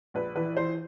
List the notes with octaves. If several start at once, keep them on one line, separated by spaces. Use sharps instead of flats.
A#1 B4
E3 B4
E3 C5